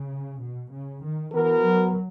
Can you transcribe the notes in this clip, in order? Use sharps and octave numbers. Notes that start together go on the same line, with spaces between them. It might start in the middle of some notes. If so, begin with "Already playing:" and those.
Already playing: C#3
B2
C#3
D#3
E3 B3 F#4 A#4
F#3